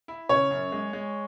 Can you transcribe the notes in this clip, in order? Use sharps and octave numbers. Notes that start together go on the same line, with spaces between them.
E4
C#3 C#5
F#2
G#3
G#3